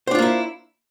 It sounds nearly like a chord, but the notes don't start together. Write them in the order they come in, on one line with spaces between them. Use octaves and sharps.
C5 D4 F4 A#3 E4